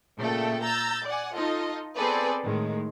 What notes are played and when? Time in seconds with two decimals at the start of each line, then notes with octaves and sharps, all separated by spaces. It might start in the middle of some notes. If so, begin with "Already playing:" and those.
0.19 A#2 C#3 A3 A4 G5
0.62 A#5 E6 G6 A6
1.05 D5 F#5 G#5
1.34 D#4 F4 A4 D#5
1.95 B3 C4 G#4 A4 B4 D5
2.44 A2 D#3 G#3